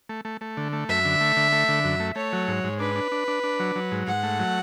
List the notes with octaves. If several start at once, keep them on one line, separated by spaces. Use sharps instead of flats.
A3
A3
A3
D3
A3
F#2 E5
D3
A3
D3
A3
D3
F#2
A3
A3 C#5
F#3
G#2
G#2
D4 B4
D4
D4
D4
D4
F#3
F#3
G#2
G#2 F#5
A3
F#3